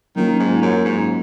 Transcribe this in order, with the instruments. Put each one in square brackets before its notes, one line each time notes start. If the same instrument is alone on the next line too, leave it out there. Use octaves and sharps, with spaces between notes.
[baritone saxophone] D#3 [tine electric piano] F#3 A#3 C#4 F4
[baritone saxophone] G#2
F#2
G#2